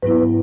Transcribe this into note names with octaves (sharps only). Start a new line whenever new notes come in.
G#2 F#3 B3 E4 B4